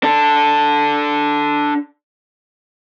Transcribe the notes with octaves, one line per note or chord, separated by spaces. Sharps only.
D4 A4